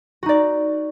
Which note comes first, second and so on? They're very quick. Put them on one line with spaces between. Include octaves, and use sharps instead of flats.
F#4 D#4 D5